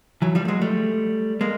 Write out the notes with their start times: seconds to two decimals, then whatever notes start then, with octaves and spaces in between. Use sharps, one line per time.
0.22 E3 F#3
0.35 F3 G3
0.45 A3
0.48 F#3 G#3
0.61 G3 A3
1.41 G#3 A#3